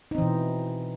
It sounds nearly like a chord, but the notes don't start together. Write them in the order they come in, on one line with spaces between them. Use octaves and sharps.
D#4 C4 E3 B2